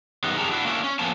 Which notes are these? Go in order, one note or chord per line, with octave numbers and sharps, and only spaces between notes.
F#2 D#3 G3 B3 D#4
F2 C#4 G4 G#4 A5 A#5
D4 E4 F#4
A#3 C#4 D4 E4
C#4
F3 A#3 B3 C#5 G#5 A5